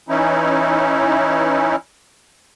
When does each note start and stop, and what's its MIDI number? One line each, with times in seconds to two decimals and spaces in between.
0.09 1.76 52
0.09 1.76 61
0.09 1.76 63
0.09 1.76 64